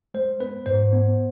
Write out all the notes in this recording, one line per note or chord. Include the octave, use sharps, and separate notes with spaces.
G#3 C5
B3 B4
G#2 C5
B3